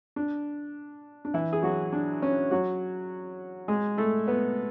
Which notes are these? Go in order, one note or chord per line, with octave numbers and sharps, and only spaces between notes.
D4
D4
E3 E4
G#4
F#3 F#4
D4
C#4
F#3 F#4
G#3 G#4
A3 A4
B3 B4